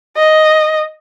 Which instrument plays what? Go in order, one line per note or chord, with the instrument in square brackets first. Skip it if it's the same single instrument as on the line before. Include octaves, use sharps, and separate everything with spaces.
[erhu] D#5